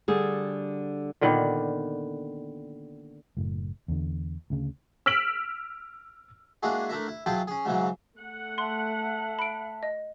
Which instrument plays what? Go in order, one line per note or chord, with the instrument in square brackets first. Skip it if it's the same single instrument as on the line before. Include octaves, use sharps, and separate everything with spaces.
[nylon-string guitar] D3 G3 G#4
[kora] A#2 D3 D#3 B3
[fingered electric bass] F#1 A2
E2 D3
D2 C#3
[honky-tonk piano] E6 F6 B6 D7 F#7
[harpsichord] G#3 A#3 D4 E4 F#4 G#4
A3 D4 E4 A#4 E5
E4
F#3 E4 F4 G#4 G5 A5
C#4 G#4
G#2 C#3 E3 F#3 G#3
[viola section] A3 F#5
[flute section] E5 A5 [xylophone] C6
[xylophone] B5 D7
D#5